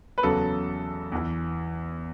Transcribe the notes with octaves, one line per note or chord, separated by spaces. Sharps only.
B4
E2 C#3 F#3 A4
E2 E3